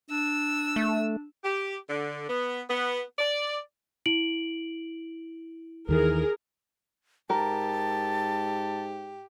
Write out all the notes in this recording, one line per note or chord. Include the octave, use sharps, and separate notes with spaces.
D4 E6
A3
G4
D3
B3
B3
D5
E4 D7 F#7
D#2 D#3 E3 G#4 A#4
G#2 G4 A#4 A5